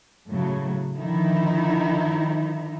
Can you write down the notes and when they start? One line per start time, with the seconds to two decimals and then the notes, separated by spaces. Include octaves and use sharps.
0.29 A2 C#3 F#3
0.95 D3 D#3 F3 D#4 E4